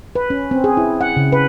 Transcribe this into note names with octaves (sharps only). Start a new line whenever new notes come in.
B4
C#4
C4
G#4
E4
F#5
C#3
B4